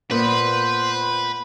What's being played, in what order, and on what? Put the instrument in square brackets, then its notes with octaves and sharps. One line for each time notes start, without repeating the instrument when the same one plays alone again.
[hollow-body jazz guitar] A#2 A#3 B3 [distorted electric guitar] B4 [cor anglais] C5